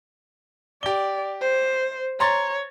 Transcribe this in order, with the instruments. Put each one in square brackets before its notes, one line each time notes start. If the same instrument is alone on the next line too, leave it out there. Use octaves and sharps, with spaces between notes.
[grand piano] G4 G7 [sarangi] D5
[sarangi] C5
[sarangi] C#5 [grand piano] A#5 C6 A6